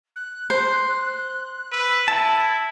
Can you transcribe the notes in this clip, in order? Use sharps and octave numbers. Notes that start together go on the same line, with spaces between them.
F#6
C5
B4 E6
E4 A5